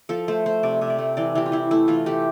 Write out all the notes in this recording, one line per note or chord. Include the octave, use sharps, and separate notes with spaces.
F3 A4
A3 C5
A3 C5
C3 D5
C3 E5
D5
A3
E3 D5
E3 G4
F4
E3 E4
A3 E4
E3 F4
A3 G4